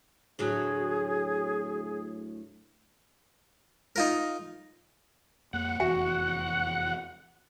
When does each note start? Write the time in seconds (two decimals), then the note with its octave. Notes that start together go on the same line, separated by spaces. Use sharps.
0.39 D2 A2 F#3 G#4
3.96 D#4 F4 A#4
5.53 F2 A#3 F#5
5.80 F1 E2 F#4 C#7